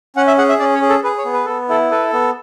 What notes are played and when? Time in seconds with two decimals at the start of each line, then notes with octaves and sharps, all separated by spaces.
0.16 C#4 F#5
0.27 E5
0.38 G#4 F#5
0.49 E5
0.59 C#4 D5
0.74 C#5
0.82 G#4
0.89 A4
1.03 G#4 B4
1.18 C#5
1.25 B3
1.33 B4
1.45 B3 A4
1.69 E4 A4
1.91 A4 B4
2.13 B3